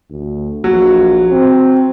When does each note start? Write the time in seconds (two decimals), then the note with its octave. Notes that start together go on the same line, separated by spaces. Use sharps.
0.10 D2
0.64 A#1 F#3
1.31 C4